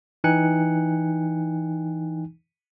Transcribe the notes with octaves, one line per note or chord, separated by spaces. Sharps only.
E3 D#4 G5 G#5 F#6 C#7